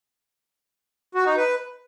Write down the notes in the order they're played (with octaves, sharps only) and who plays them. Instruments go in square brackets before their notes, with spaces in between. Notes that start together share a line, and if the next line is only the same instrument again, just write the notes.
[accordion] F#4
D#4
B4